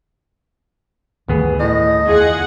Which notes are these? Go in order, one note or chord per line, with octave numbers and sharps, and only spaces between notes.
G1 D2 D#3 A3 B3 G#4
A2 D#5
E2 F4 G#4 F#5 G#5